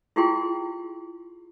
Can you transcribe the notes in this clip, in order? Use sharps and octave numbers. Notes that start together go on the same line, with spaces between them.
E4 F4 G4 G#4 G5 C6